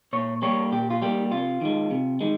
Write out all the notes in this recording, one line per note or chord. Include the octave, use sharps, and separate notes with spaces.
A#2 C#5
G3 A#3 C#5
A#2 G4
F4
G3 A#3 G4
C3 F4
D#3 G#3
C3
D#3 G#3